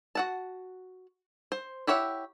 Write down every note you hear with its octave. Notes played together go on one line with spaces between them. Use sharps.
F#4 F#5 A5
C5
E4 G4 C#5 E5 F#5